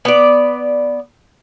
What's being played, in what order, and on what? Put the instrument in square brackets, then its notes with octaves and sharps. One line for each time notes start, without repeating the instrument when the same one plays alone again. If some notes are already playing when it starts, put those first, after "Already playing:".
[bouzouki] B3 D5